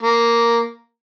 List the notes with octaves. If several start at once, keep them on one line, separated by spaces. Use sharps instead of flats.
A#3